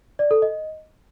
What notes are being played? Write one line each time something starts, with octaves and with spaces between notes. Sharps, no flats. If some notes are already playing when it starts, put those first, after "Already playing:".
D5
A4
D#5